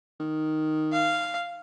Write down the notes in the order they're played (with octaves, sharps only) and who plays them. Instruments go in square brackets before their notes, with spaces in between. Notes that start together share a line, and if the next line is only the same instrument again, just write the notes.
[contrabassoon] D#3
[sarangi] F5